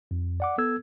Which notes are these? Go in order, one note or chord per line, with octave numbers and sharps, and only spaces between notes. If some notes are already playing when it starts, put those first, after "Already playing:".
F2
D5 F#5 D6
B3 A4 E6 G#6